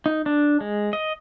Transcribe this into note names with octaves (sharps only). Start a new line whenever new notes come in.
D#4
D4
G#3
D#5